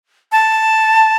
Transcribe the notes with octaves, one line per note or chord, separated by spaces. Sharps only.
A5